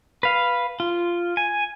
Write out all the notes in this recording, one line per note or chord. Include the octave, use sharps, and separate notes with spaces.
B4 F5
F4
G#5